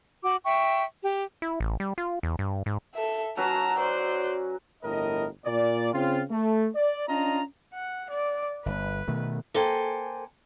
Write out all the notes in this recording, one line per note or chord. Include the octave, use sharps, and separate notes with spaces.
F#4 D6
E5 G5 C#6
G4
E4
A1
G3
F4
E2
G2
G#2
A4 E5
F#3 C#4 B4 A5 A#5
C5 D5
G1 A2 A#4 D#5
A#2 D5
C#3 C4 F4
A3
D5
C#4 D4 F4 D#5 A#5
F#5
D5
G1 B4
B2 D#3 A3
A#3 A4 C5 G5 G#5